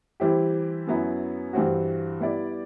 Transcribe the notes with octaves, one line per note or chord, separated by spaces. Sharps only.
E3 G3 C4 E4 G4
F#2 F#3 B3 E4
G2 E3 G3 C4 F#4
G3 B3 E4 G4 D5